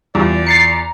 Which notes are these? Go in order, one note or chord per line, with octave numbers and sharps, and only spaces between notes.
E2 G3 F4 D5
A#5 A6 C7 C#7